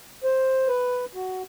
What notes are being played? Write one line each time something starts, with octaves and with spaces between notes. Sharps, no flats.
C5
B4
F#4